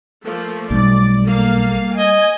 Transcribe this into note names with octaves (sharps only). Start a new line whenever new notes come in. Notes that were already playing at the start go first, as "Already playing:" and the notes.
F3 A3 A#3
B1 G3 A3 D5
A#3 A4 F5
D#5 G#5